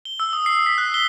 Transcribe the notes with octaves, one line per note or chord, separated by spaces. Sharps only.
G7
E6
D#6
C7
B6
F#6
G7